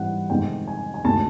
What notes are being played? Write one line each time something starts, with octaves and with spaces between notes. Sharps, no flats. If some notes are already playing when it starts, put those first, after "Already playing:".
Already playing: G#2 E3 G3 C4 E4 F#5
F2 C3 D#3 G#3 G5
G#5
G#5
D2 C3 D#3 G#3 A5